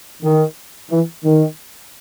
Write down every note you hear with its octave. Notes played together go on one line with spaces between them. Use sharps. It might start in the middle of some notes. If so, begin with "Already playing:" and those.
D#3
E3
D#3